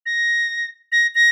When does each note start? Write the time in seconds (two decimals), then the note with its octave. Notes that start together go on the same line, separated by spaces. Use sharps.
0.06 A#6
0.92 A#6
1.15 A#6